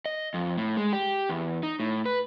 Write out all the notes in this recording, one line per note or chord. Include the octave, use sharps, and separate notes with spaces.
D#5
F2
A2
G#3
G4
E2
D#4
A2
B4